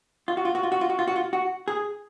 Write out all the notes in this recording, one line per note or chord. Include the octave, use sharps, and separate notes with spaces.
F4
F#4
F4
F#4
F4
F#4
F4
F#4
F4
F#4
F4
F#4
G#4